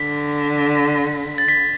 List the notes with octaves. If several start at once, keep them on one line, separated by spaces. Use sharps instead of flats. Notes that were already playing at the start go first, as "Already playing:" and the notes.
Already playing: D3 B6
A6
B6